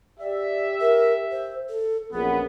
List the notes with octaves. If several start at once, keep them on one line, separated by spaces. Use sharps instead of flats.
G4 D5 E5
A#4
C5
A4
A#1 F#2 B3 G#4